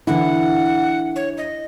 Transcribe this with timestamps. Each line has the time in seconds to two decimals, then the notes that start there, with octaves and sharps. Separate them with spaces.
0.07 D3 E3 E4 F#5
1.16 C#5
1.37 D#5